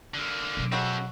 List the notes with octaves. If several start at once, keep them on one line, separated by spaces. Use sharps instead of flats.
D3 A#3
B2 F#3
C#3 G#3 C4 F#4 A4